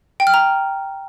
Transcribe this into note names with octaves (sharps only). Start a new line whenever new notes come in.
G5
F6
A#5